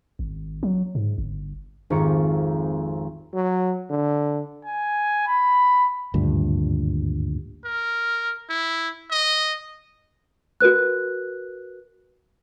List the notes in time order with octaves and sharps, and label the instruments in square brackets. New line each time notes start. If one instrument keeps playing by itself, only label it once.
[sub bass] G#1
F#3
G#2
G1
[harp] G#1 F2 G4 A#5 C#6 C#7
[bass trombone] F#3
D3
[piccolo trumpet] G#5
B5
[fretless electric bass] G#1 D2 G2 A#2
[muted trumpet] A#4
E4
D#5
[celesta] F#4 A#4 B4 F#6